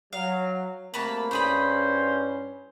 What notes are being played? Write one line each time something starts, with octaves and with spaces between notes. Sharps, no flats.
F#3 F5
C3 A3 A#3 F#4 A5 B5
G2 C#4 E4 G#4 C5 B5